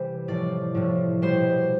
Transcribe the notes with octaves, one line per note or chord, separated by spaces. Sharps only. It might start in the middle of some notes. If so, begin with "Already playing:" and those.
Already playing: C3 E3 G3 C5
A2 F3 D5
A2 F3
B2 G3 C5